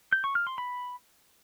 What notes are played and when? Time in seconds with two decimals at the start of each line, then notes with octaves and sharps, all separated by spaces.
0.12 G6
0.24 C#6
0.35 F6
0.47 C6
0.58 B5